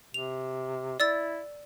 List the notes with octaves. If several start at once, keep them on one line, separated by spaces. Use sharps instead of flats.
C3 F7
E4 D5 E6 A6